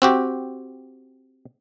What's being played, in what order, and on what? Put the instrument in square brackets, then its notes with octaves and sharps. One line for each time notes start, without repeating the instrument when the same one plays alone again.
[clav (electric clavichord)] C4 F#4 G4